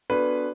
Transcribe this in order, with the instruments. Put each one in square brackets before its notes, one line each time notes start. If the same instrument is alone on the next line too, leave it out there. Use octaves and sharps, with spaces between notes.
[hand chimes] B3 D4 F#4 A4 D5 [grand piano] B4